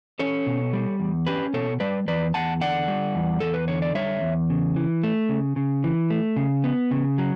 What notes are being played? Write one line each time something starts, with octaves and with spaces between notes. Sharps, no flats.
C#4 A4 C#5
B2
G3
E2
C#4 G4 B4
B2 A4 C#5
G3 B4 D5
E2 B4 D5
E2 F#5 A5
D3 D5 F#5
G3
E2
E2 A4
B4
D3 C#5
D5
G3 C#5 E5
E2
C#3
E3
A3
C#3
C#3
E3
A3
C#3
B3
C#3
F#3